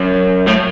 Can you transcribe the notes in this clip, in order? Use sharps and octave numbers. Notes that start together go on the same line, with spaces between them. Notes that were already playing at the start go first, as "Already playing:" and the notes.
Already playing: F#2
A2